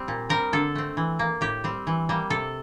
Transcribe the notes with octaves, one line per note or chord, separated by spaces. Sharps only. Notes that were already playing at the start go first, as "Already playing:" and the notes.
Already playing: G3 C4
A#2
G3 C4 A#4
D3 A4
A3 C4
E3
A#3
A2 G4
G3 C4
E3
G3 A#3
C3 A4